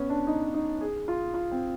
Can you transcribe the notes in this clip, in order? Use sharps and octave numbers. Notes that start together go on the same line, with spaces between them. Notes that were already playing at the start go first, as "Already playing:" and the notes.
Already playing: B3 C#4
D4
D#4
D#4
G#4
F4
F4
C4